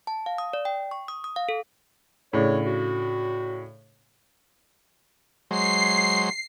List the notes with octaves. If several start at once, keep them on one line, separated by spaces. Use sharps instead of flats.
A5
F5
D#6
D5
G5
C#6
D#6
D#6
F5
A4
A2 C#3 D4 C#5
F#4
F#3 G#3 C5 C7